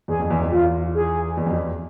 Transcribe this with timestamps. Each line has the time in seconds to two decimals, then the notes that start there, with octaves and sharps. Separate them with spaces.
0.08 E2 G#4
0.20 F2
0.30 E2
0.41 F2
0.51 E2 F4
0.95 G#4
1.37 E2
1.46 F2
1.53 E2